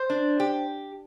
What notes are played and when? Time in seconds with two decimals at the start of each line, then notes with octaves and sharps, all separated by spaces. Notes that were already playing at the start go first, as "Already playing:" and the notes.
Already playing: C5
0.10 D4
0.40 G4